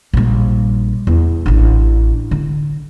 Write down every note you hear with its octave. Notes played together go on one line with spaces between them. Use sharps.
A#1 G3
E2
A1 D4
D3